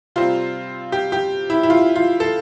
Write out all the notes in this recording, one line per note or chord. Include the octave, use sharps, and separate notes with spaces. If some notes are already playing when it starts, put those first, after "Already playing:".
C3 G3 C4 F4
G4
G4
E4
E4
F4
F4
A4